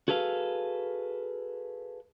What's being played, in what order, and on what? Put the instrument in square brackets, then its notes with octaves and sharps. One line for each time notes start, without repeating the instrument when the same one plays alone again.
[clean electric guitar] F#4 G#4 A4 B4 F5